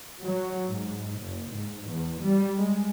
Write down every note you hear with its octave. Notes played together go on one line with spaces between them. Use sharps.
F#3
G#2
F#1
G#2
E2
G3
G#3